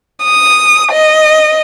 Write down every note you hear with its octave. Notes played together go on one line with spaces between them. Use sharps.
D#6
D#5